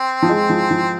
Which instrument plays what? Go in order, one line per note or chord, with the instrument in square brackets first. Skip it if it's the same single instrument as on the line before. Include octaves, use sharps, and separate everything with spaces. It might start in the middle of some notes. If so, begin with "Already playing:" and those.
Already playing: [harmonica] C4
[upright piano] F3
G#3
F3
F3